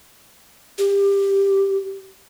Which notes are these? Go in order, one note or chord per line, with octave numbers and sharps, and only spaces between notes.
G4